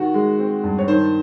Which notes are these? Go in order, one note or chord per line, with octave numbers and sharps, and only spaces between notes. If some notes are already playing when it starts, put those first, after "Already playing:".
Already playing: D#3 F#4
G#3
C4
G2
C#5
D#3 C5